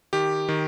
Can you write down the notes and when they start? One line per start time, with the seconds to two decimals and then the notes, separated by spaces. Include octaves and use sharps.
0.13 D#3 G4
0.49 D#3